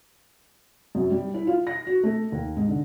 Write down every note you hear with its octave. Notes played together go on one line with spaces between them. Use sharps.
F#2
G3
E4
F4
A#6
F#4
A3
D#2
G#2
D3